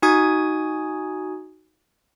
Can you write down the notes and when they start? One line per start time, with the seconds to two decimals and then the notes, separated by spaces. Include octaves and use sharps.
0.02 D#4 F#4 G#5 D#6 G#6